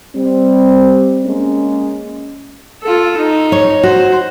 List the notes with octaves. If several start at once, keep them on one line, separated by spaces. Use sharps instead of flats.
G3 C4
G#3 A#3 C#4
F4 A4
D#4
C#5
F#4 C5